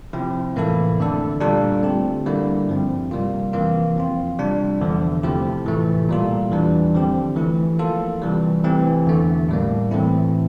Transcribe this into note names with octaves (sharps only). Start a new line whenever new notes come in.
C3 F3 C4 E4
A2 E3 A#3 E4 A4
F2 D3 A3 D4 A4
A#2 G3 D4 F4 A4
D3 A3 C4 G4
D3 G3 A#3 E4
G2 F3 C4
C3 G3 A#3 F4
F2 E3 A#3 F4
F3 C4 F4
C3 G3 D4
E2 D3 F3
C3 F3 A3 E4 G4
A2 E3 A3
A#2 G3 A#3 F4 A4
E2 E3 G3 D4
D3 F3 C4 G4
E3 A3 E4
F3 A#3 F4 A4
C3 E3 G3
E3 A3 C4 G4
E2 D3 A3
A2 G3 A#3
A2 E3 A3 C4 E4